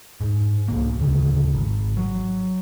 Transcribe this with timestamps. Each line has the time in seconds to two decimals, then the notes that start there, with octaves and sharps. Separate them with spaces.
0.21 G#2
0.68 C2 A#3
0.99 D1 D2 C#3
1.54 G#1
1.97 F#3